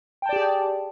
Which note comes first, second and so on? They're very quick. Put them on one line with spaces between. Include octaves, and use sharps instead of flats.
G5 A5 D5 G4 G#4